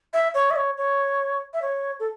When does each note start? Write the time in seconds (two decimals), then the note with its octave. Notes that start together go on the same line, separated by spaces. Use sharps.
0.13 E5
0.34 C#5
0.51 E5
0.56 C#5
0.78 C#5
1.54 E5
1.62 C#5
2.00 A4